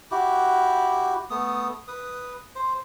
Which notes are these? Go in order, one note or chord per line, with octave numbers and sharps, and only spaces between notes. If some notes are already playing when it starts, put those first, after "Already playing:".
E4 F#4 G4
A3 B3 D#6
B4 D#6
C5